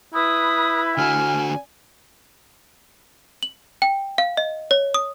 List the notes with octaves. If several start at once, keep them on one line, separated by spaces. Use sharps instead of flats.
E4 B4 D#6
D3 F#4 G#5 F6
F#7
G5
F5
D#5
C#5
D#6